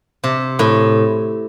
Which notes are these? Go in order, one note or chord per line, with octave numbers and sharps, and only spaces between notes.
C3
A2